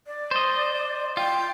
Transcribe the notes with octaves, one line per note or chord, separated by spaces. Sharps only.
D5
C5 D#5
F4 G5